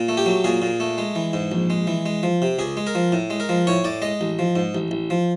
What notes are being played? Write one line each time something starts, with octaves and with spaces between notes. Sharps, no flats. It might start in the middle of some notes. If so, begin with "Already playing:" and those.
Already playing: A#2
A3
G4
F#3
A#2 G#4
A#2
A3
G#3
E3
G#2
A#1
G#3
E3
G#3
F3
C3
C#2 G#4
G#3
A#4
F3
A2
G#3
A#4
F3
A2 C#5
A2 D5
G#3 D#5
A1
F3
G#2
A1
A1
F3